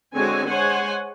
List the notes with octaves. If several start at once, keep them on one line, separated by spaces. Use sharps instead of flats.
D3 G#3 C4 F#4 C#5 G#5
G#3 C5 C#5 F#5 G#5